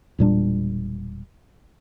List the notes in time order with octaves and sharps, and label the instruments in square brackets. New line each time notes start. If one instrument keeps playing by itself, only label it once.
[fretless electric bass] E1 A#2 G3 D4